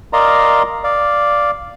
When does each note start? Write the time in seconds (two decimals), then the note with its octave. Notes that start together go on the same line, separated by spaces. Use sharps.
0.13 A#4 D5 D#5 F5 A#5 C6
0.84 D5 F5